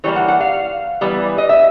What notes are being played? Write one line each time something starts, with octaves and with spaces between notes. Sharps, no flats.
E3 G3 A#3 C#5
F#5
F#5
F5
E3 G3 B3
D#5
E5